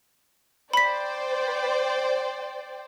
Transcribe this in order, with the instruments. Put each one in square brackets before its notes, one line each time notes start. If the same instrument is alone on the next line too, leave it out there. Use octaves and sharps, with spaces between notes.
[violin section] C5 D5 G5 [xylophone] B5 B6